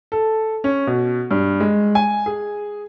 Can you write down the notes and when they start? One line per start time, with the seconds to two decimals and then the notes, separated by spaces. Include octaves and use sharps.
0.12 A4
0.64 C#4
0.87 B2
1.31 G2
1.60 G#3
1.95 G#5
2.26 G#4